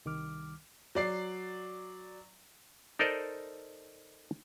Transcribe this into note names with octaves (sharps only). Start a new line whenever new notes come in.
C2 D#3 G3 D6 F6
F#3 D5 C7
D#4 A4 A#4 C5 D5 D#5